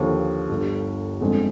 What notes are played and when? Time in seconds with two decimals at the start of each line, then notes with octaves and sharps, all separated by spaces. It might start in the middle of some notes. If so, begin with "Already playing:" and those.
Already playing: D#2 D3 F3
0.49 G1 G2 D3
1.21 G1 F2 D3 G#3